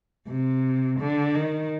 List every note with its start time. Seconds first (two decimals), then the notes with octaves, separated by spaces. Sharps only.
0.27 C3
0.99 D3
1.35 D#3